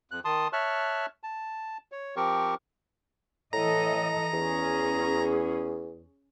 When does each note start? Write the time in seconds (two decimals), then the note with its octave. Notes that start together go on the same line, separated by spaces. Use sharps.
0.11 F2 F#6
0.25 D#3 A5 C6 D#6
0.53 C#5 E5 A5 C#6 F6 F#6
1.23 A5
1.92 C#5
2.16 F3 C4 G4 A#4 C#6
3.53 A2 E3 A4 D#5 A#5
4.33 E2 C#4 G#4